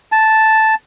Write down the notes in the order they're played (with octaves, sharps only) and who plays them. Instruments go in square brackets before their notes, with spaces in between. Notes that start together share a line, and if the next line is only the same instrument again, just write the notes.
[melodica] A5